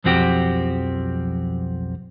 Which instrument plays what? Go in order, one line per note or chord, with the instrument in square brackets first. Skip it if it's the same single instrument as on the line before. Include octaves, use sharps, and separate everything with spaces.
[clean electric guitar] B1 F2 F3 C4 F#4 G4